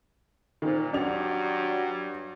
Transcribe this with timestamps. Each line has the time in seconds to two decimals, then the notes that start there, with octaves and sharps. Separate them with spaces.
0.62 A#2 D#3 C4
0.93 G2 F#3 D4 F7